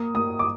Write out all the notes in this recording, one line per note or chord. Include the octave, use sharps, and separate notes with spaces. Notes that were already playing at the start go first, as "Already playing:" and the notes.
Already playing: A#3 D#6
A#3 D#6
D6